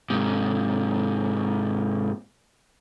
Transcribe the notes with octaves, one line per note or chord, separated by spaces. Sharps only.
G#2 C3